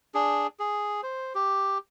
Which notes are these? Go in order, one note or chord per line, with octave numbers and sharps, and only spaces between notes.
D4 G#4
G#4
C5
G4